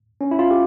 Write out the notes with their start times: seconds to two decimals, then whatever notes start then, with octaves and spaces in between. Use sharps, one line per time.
0.21 C#4
0.31 E4
0.39 F4
0.51 G4